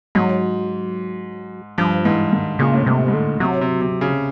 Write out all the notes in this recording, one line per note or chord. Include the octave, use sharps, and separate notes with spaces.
G#2 F#3
G2 F3
G#2 E3
G#2 D#3
A#2 C#3
A2
G#2 C3
G#2
A2 D3
C3 F#3
C3
C3
C#3